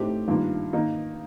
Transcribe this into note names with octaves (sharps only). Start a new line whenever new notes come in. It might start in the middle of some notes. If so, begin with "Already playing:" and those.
Already playing: A2 A3 C4 D#4 G4
G2 D#3 A#3 D4 F4
D#3 A#3 D#4